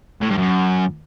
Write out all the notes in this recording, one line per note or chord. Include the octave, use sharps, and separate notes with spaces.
A2
G2
F#2